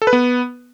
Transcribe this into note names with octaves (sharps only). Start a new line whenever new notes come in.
A4
B4
B3